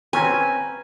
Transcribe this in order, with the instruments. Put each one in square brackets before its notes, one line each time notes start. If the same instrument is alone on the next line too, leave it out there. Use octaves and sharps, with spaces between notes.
[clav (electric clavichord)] C4 C#4 [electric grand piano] B4 G5 A#5 [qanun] G#5